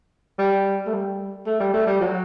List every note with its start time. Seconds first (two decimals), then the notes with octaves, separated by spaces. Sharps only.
0.39 G3
0.87 A3
0.93 G3
1.46 A3
1.60 G3
1.74 A3
1.87 G3
2.00 F#3